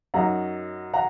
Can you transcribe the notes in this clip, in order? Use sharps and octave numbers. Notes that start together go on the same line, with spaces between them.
F#2 F#3 D#4 F#5 A#5
F#5 A#5